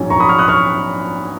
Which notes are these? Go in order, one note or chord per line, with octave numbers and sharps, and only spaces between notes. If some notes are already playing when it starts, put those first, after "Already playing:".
Already playing: A#1 G#2 F#3 C#4 G#5
A#5 C#6
B5 D#6
C#6 F6
D#6 F#6
C#6 F6